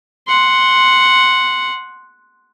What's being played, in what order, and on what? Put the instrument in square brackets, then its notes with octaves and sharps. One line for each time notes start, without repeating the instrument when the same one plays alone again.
[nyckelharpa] F#5 C6